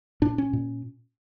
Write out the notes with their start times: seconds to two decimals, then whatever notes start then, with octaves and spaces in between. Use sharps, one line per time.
0.22 A#2 D4
0.38 C#4
0.53 A#2